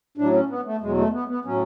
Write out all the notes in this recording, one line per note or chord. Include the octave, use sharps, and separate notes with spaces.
A2 F#3 D4
C#4
B3
A3
E2 B2 F#3 G#3
A3
B3
B3
A2 F#3 C#4